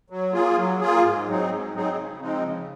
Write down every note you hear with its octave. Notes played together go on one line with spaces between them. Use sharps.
F#3
A#3 F4 G#4
F#3
A#3 F4 G#4
G#2
F#3 C4 D#4 G#4
G#2
F#3 C4 D#4 G#4
C#3
F3 G#3 C4 D#4
C#3